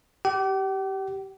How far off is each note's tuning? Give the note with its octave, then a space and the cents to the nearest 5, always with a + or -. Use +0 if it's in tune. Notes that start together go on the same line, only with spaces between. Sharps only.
G4 -15 G5 -45